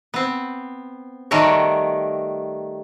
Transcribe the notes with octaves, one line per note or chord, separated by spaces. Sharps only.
B3 C4
D#3 G3 A3 F#4 C#5